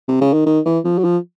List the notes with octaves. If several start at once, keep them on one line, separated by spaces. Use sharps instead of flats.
C3
C#3
D#3
D#3
E3
F3
F#3
F3